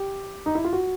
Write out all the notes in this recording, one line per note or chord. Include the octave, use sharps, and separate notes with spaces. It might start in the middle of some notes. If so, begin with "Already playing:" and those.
Already playing: G4
D#4
E4
F4
F#4